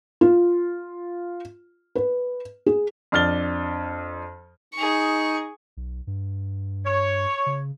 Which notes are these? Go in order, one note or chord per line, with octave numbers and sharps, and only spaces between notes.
F4
B4
G#4
F2 D4 F6 A6 G7
D#4 G#4 C#6
B1
G2
C#5
C#3